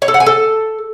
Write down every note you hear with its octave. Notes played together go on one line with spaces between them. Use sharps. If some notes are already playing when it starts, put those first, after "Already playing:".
C#5
A4
F#5
G#5
A4